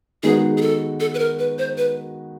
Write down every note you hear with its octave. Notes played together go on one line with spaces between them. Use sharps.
D#3 G#3 B3 D#4 F#4 G#4
G#4
A4
A4
B4
A#4
B4
C5
B4